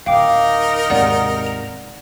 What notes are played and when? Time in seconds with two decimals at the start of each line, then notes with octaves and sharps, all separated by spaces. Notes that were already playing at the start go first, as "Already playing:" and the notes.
0.06 D1 D#4 A#4 F5 G5 D6
0.90 D#2 G#2 C3 D5 F#5
1.47 F7